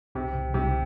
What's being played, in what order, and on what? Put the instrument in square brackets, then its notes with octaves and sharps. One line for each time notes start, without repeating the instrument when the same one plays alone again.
[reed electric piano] C2 [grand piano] C3
[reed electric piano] C2
[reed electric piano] C2 [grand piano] C3